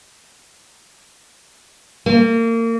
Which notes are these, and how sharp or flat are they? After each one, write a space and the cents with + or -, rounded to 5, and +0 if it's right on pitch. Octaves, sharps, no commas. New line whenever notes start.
A#3 -30